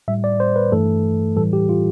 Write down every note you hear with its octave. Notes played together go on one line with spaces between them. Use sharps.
A2 G3 E5
D5
C5
B4
G2 E3 A3 A4
A2 E3 G3 A4
G4
F4